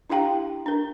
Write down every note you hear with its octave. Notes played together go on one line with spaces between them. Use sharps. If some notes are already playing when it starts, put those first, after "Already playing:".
D4 E4 G4 F5 G5 A#5
D4 A#4